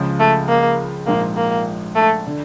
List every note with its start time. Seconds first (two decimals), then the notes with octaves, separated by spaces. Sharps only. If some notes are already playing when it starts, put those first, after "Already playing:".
Already playing: C#2 C#3 F3
0.20 A3
0.48 A#3
1.07 A#1 G#2 F3 A#3
1.37 A#3
1.96 A3
2.27 D3